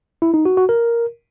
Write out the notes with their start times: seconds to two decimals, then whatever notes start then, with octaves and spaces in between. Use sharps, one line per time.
0.22 E4
0.34 D#4
0.45 F#4
0.57 F#4
0.69 A#4